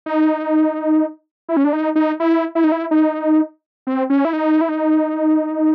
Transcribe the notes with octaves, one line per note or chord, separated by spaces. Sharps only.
D#4
E4
C#4
D4
D#4
D#4
E4
E4
D#4
E4
D#4
C4
C#4
E4
D#4
E4
D#4